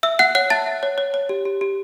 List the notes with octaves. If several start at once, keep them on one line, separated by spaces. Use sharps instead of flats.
E5 E6
E5 F#5 F#6
C#5 F#5 F#6
E5 A5 A6
E5
C#5
C#5
C#5
G4
G4
G4